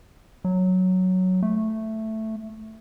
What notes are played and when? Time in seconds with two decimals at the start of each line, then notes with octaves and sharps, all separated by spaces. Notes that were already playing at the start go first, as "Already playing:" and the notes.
0.45 F#3
1.43 A3